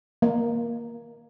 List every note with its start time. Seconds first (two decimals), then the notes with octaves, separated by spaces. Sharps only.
0.22 A#3